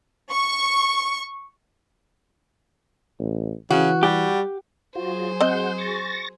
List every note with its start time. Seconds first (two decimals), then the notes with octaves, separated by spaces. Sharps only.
0.32 C#6
3.19 A1
3.71 C#3 E3 F#4
4.03 G3 G4
4.96 F#3 F4 F#4 G#4 C5 G#5
5.41 C4 D#5 F#5 G6
5.78 C#6 A6 A#6